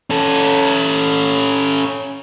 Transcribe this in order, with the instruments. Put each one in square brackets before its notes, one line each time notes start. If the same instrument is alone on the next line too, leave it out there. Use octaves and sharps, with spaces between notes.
[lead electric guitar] C#4 A4